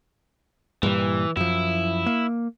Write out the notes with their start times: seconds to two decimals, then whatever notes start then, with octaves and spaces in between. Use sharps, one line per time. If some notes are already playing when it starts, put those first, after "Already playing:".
0.83 G2 A#2 E3 G3
1.37 F#2 F3 E4
2.06 A#3